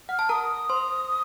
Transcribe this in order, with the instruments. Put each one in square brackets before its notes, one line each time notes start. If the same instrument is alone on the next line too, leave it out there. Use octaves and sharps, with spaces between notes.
[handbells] F#5 [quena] F6
[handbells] A5
[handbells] A#4 A#5 [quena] D#6
[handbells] C5 C6